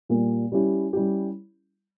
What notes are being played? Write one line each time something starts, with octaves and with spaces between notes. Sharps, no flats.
A#2 G3 A#3
G3 C#4 E4 G4
G3 C#4 E4 G4